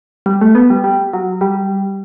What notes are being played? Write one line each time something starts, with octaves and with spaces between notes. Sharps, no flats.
G3
A3
B3
G3
G3
F#3
G3